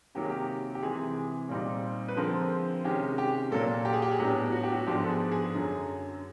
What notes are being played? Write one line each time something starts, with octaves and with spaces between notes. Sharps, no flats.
C3 D#3 F#3 A#3 G4
G#4
G4
G4
C3 E3 G#3 G#4
A#2 G3 C4 D#4
B4
D3 F3 G#3 C4 A#4
C3 D#3 G#3 C#4 G4
G4
A#2 F#3 A#3 A4
G4
G#4
G4
G#4
A2 F#3 B3 D4 G4
F#4
G4
F#4
G#2 F3 G#3 B3 D4 G4
A4
G#4
G#4
F#2 D3 F#3